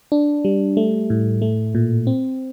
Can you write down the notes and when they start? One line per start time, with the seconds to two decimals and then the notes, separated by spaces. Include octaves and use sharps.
0.12 D4
0.45 G3
0.77 A3
1.10 A2
1.42 A3
1.75 A#2
2.07 C4